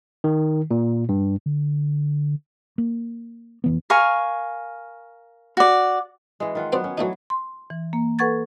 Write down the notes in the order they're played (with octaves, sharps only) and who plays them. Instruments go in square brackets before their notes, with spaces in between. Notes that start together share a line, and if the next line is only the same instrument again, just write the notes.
[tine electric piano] D#3
A#2
G2
[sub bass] D3
[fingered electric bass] A#3
F1 E3 B3
[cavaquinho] A#4 F5 G#5 C#6
F#4 D5
[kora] E3 G#3
D#3 F4 F#5
[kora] F#3 B3 F#5 [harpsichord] C4 C5 D5
[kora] C#4
[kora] E3 F#3 [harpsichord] A3 D4 D#4
[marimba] C6
E3
A#3
A4 B4 F#5 C#6 G#6 A6